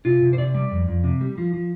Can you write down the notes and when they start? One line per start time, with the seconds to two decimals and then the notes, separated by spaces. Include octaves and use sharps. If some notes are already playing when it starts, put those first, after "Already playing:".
0.05 C3 F4
0.22 C3
0.33 C5
0.38 C3 D5
0.54 G3
0.71 F2
0.88 F2
1.04 C3
1.21 G3
1.38 F3
1.53 F3